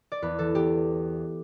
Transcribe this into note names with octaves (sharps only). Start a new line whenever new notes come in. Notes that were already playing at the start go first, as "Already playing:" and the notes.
D5
E2 B4
E3 A4
E2 G4